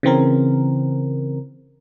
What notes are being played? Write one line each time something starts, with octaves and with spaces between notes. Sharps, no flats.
C#3 E3 C4 A#4